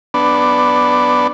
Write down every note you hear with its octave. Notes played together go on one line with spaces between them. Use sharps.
B3 D4